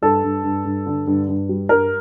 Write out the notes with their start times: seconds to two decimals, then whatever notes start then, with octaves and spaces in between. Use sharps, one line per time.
0.02 G2 A4
0.24 G2
0.44 G2
0.65 G2
0.86 D3
1.07 G2
1.29 G2
1.49 G3
1.69 G2 A#4